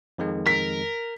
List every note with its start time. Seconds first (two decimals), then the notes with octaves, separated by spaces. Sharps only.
0.18 F2 D#3 G#3
0.47 A#4 B6